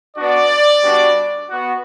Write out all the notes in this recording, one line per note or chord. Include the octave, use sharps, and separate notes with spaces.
B3 D4 F#4 D5
G3 B3 D4 F#4
B3 F#4